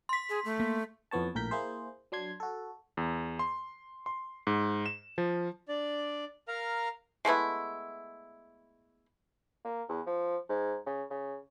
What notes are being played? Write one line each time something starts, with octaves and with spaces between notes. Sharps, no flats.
C6 B6
G#4
A3
A#3
F2 E3 B3 C#5 A5
A#1 A2 A#4 G6 B6
A#3 E4 G#4 C5
F#3 D4 C6 G#6
F#4 A4
E2
C6
C6
G#2
E7
F3
D4 D5
A#4 F5 A#5
G#3 A3 B3 E4
A#3
E2
F3
G#2
C#3
C#3